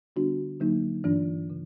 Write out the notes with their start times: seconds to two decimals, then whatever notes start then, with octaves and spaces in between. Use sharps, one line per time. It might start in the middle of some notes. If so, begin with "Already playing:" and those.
0.16 D3 G3 B3 D4 F#4
0.60 D3 F#3 A#3 D#4
1.04 G2 E3 A3 D4
1.50 C#3